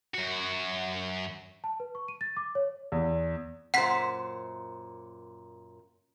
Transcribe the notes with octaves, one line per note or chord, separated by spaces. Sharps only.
F#2 F#4
A5
B4
C#6
D#7
A6
D6
C#5
E2
F#2 A#2 C5 F#5 B6